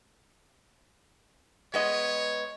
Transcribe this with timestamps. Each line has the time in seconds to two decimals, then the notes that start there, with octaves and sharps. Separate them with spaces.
1.74 G#3 B3 C#5 D#5